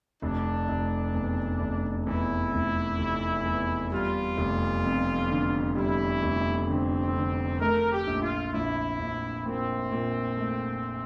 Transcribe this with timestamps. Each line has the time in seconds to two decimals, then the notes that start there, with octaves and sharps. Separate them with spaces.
0.22 F1 D4
0.68 F1
1.14 E2
1.61 F1
2.07 E2 E4
2.53 F1
2.99 F1
3.46 E2
3.91 G3 F4
4.38 F1
4.84 F2
5.30 D3
5.76 G3 E4
6.23 F1
6.68 D3 C4
7.15 D3
7.60 A3 A#4
7.92 G4
8.07 A#1
8.22 F4
8.54 A#1 E4
8.99 A#1
9.45 A#2 C4
9.92 A#2
10.37 A3